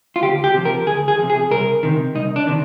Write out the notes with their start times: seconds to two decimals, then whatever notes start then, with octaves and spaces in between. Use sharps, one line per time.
0.16 F4
0.23 D2 G4
0.44 G4
0.54 C3 F3
0.65 A#4
0.87 D2 G#4
1.08 G#4
1.19 C3 F3
1.30 G#4
1.51 C2 A#4
1.83 C3 D#3
2.15 C2 D#4
2.36 D4
2.47 C3 D#3